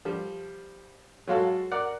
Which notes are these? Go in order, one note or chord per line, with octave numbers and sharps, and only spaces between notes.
F3 G3
F#3 G#3 F4 F#4 A4
A#4 D5 F#5